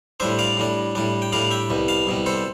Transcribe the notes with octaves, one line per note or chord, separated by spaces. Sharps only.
A2 G3 D4 C5 E5
D5 F5
A2 G3 D4
A2 G3 D4
G5
A2 G3 D4 D5 F5
E5 G5
C2 B2 G3
F5 A5
C2 B2 G3
A4 C5